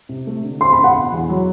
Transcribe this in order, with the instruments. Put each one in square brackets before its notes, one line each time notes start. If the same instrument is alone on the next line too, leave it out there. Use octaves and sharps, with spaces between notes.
[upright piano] C3
A3
D3
[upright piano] C4 [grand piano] C6
[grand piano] B5
[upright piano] D3
[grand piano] F#5
[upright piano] B2
E2
F#3